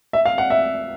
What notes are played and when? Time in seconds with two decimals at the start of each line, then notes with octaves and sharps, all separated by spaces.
0.13 E5
0.25 F5
0.38 F#5
0.50 E5